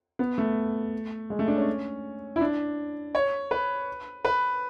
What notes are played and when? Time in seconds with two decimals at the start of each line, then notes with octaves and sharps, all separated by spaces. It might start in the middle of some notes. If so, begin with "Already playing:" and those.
0.19 B3
0.38 A3
1.30 G#3
1.39 A3
1.48 D4
1.57 C#4
2.36 E4
2.41 D4
3.15 C#5
3.51 B4
4.25 B4